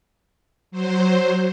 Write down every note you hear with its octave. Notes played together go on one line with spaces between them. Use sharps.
F#3 C5